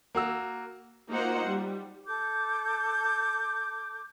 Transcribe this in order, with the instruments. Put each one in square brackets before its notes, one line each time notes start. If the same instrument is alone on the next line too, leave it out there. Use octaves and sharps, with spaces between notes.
[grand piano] A#3 F#4 E6
[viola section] A#3 D#4 F4 F#4 C5 F#5
G3
[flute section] A4 D6 G6